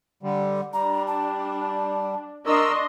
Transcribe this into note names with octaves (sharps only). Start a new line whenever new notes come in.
D3 G3
G3 D4 A#5
A5
D4 A#4 D#5 C6 C#6 E6